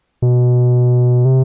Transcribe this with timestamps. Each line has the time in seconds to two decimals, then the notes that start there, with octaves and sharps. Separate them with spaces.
0.22 B2
1.25 C3